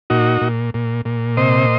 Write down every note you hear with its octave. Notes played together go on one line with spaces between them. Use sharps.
A#2 D#4 F#4
A#2
A#2
A#2
C3 C5 D#5